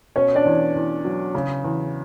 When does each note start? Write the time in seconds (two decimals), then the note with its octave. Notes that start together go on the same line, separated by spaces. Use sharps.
0.16 B2 C#4 C#5
0.35 D4 D5
0.45 E2
0.75 E2
1.05 F#3
1.35 C#3
1.64 E2